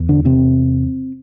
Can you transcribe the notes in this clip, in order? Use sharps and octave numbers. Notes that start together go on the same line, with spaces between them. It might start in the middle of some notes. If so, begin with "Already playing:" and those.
Already playing: E2
D3 D4
C3 C4